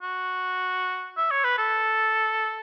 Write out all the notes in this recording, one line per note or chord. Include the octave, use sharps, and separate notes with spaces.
F#4
E5
C#5
B4
A4